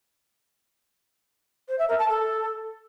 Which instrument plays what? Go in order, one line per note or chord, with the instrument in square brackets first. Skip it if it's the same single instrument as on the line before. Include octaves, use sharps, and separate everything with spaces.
[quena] C5
E5
A#4
A5
A4